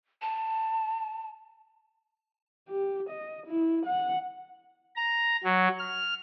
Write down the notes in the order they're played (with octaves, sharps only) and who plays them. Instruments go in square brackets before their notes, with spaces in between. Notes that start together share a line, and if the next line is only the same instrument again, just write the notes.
[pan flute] A5
[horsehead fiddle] G4
D#5
E4
F#5
[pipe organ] A#5
F#3
F6